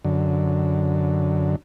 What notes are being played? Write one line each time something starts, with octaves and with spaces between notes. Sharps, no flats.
F#2 D3